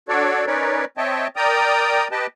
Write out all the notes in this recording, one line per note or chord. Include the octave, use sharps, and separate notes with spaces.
D4 F#4 A4 C#5 D5
C#4 D#4 A#4 B4 C#5 D5
C4 C#5 D#5 E5 G5 A5
A#4 D5 G5 A#5 D#6
G4 B4 D#5 G5 A5